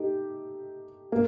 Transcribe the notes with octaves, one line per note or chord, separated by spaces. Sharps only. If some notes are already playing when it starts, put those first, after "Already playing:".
Already playing: A3 D#4 G4
A#3